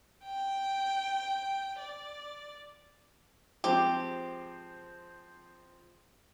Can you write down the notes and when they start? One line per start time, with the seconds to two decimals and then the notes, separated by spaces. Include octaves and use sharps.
0.25 G5
1.80 D5
3.64 F3 G#3 C4 G4